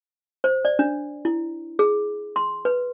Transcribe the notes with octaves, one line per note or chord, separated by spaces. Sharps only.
C5
D5
D4
E4
G#4
C6
B4